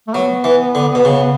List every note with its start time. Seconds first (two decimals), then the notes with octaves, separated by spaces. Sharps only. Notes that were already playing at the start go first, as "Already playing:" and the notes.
0.08 A3
0.14 F#3 B3
0.44 E3
0.75 D3
0.95 B2
1.05 C#3